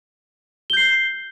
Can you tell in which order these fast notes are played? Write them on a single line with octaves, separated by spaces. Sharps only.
G7 G6 C7